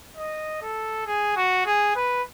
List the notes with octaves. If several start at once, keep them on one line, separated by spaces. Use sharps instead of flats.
D#5
A4
G#4
F#4
G#4
B4